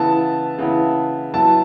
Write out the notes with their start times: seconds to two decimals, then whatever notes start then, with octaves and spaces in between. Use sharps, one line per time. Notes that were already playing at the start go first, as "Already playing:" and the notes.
Already playing: C#3 E3 B3 E4 A5
0.58 C#3 E3 B3 E4
1.34 F#3 B3 E4 A5